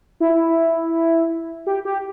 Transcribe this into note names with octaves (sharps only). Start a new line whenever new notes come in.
E4
G4
G4